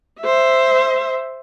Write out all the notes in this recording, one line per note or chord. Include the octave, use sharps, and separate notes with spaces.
C5 E5